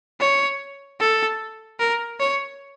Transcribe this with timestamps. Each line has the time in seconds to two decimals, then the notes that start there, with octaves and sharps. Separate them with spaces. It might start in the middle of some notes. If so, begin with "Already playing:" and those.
0.20 C#5
1.00 A4
1.79 A#4
2.20 C#5